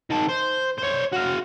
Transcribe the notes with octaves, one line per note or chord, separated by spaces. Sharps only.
D#3 A5
C5
C5 C#5
F#4 F5